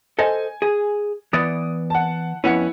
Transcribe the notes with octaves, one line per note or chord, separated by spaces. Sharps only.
A4 C5 D#5 G#5
G#4
E3 B3 D5 D#6
F#5 A5
F2 B3 C#4 E4 F#5 C#7